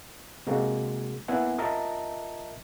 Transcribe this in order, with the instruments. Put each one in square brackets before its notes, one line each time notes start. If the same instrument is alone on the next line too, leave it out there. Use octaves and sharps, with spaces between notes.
[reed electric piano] C3 G#3 A#3 F#4
A#3 B3 E4 F#5 G#5
F4 A#4 D#5 E5 A5 A#5